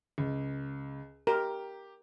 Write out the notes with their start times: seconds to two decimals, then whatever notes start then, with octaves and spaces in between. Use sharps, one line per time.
0.18 C#2
1.27 G4 A#4